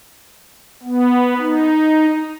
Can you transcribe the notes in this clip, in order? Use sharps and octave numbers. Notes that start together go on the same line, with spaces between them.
B3
D#4